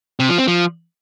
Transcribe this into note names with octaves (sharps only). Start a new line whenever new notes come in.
C3
F3
C4
F3